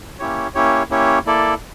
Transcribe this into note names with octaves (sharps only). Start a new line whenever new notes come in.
A#3 C#4 E4 G4 C#5
A#3 C#4 E4 G4 C#5
A#3 C#4 E4 G4 C#5
A#3 E4 A4 D5